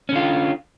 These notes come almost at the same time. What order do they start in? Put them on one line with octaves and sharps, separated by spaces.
C#4 D3 F4